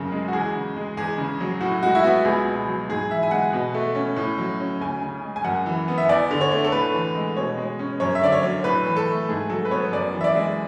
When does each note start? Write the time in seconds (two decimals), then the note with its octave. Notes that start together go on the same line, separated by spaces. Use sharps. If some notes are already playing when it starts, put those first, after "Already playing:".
Already playing: F#2 C#3 F#3
0.12 G#3
0.28 F#4
0.33 E2 G#4
0.55 C#3
0.76 G#3
0.97 E2 G#4
1.18 C#3
1.40 F#3
1.61 A2 F#4
1.83 G#3 F#4
1.95 E4
2.04 B3 F#4
2.25 C#2 G#4
2.47 B2
2.68 F#3
2.89 G#2 G#4
3.10 E3 E5
3.23 G#5
3.31 G#3 F#5
3.53 B2
3.74 A3
3.95 C#4
4.16 A2
4.38 F#3
4.60 C#4
4.81 D2 G#5
5.02 C#3
5.23 G#3
5.36 G#5
5.44 F#2 F#5
5.66 E3
5.88 B3
5.98 E5
6.09 E2 D5
6.31 D3
6.41 C#5
6.52 A3
6.64 A4
6.72 A2 B4
6.94 E3
7.15 G#3
7.37 B2 C#5
7.58 G#3
7.79 C#4
8.00 F#2 C#5
8.15 E5
8.21 D3 D5
8.32 C#5
8.43 F#3
8.64 A2 B4
8.86 E3
8.96 A4
9.08 A3
9.29 G#2 G#4
9.50 F#3 A4
9.65 B4
9.71 B3 C#5
9.92 F#2 D5
10.14 E3
10.21 E5
10.24 D5
10.35 G#3